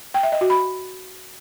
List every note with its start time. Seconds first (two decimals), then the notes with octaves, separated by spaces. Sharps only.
0.14 G5
0.23 E5
0.32 D#5
0.41 F#4
0.50 B5